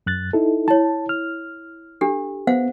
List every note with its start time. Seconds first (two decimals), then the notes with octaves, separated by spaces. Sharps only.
0.07 F#2 F#6 A6
0.33 D#4 E4 A4
0.68 E4 C#5 A5
1.09 F6
2.01 D4 G4 A4
2.47 B3 C5 F5 F#5